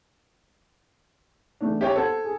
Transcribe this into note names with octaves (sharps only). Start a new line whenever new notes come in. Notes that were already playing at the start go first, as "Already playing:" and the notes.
E2 A3 D4
G4 C#5 E5 G5
A4 C5 F#5 G#6
G#4